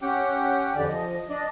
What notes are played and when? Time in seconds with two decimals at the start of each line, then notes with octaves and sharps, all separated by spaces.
0.02 C#4 G4 F#5 G5
0.75 F2 D3 G4 D5
0.88 F3 D#5
1.29 D4 D5 D#5